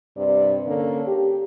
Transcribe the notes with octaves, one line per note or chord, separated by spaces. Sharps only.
G2 C3 D5
D3 A#3 C#4 A4 C#5
G4